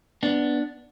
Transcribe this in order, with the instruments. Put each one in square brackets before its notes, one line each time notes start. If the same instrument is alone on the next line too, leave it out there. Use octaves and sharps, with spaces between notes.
[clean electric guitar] B3 D4